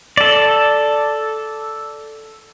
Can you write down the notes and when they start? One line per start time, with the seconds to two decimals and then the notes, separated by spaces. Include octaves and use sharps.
0.17 A4 D5